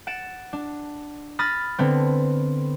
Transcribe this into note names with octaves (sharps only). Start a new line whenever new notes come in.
F#5 A6 D7 E7
D4
B5 D#6 F6 A6 A#6
D3 B3 C4